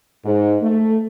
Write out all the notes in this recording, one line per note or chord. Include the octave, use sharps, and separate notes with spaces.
G#2
A3